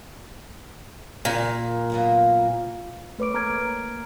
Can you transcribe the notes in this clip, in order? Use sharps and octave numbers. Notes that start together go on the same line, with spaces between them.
A#2
F#3 A#3 B3
A3 B4 C#5 D6 D7
A#3 A#5 F6 G#6 D7